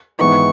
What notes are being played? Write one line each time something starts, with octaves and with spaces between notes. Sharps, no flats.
G#1 G#2 E3 B3 D#4 C#6